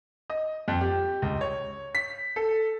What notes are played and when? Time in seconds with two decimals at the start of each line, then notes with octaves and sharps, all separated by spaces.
0.30 D#5
0.68 F2
0.81 G4
1.22 C#2
1.41 C#5
1.95 B6
2.36 A4